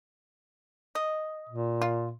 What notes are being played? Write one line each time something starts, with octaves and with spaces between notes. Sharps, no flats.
D#5
A#2
F4